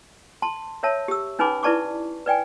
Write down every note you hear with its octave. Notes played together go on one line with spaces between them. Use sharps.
A5 C6
A#4 C#5 E5 A5
G4 E6
C#4 D#4 B4 G#5 B5 D6
E4 B4 D5 A5 C#6 D6
B4 D5 G5 G#5